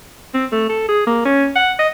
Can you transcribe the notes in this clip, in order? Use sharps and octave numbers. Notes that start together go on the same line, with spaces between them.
C4
A3
A4
G#4
A#3
C#4
F#5
D#5